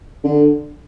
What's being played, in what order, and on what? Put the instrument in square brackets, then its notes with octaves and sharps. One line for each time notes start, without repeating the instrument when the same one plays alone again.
[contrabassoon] D3